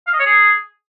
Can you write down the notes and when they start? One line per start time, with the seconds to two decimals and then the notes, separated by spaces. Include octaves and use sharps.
0.07 F5
0.13 D#5
0.20 C#5
0.26 G#4